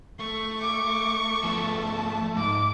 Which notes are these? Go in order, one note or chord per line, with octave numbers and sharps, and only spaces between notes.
A3 C#6
D6
F3 B3 A5
G#2 D6